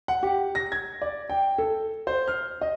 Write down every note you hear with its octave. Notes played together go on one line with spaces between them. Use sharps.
F#5
G4
A#6
G#6
D5
G5
A4
C5
F6
D#5